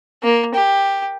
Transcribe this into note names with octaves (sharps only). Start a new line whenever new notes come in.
A#3
G4